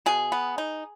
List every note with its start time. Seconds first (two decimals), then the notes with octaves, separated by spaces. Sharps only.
0.06 B2 G#4
0.32 B3
0.58 D#4